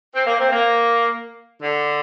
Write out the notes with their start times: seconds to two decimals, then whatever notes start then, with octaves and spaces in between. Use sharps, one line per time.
0.14 C4
0.26 A#3
0.40 C4
0.52 A#3
1.62 D3